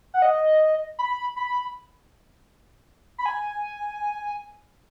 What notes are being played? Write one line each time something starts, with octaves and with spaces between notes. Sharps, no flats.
F#5
D#5
B5
B5
B5
G#5